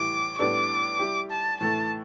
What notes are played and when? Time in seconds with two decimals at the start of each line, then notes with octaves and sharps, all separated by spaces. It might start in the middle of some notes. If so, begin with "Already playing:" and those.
Already playing: A2 E3 G3 E4 G4 D6
0.38 A2 G3 B3 D4 A4 D6
0.99 G3 E4 G4
1.30 A5
1.60 A2 E3 A3 E4 A4 A5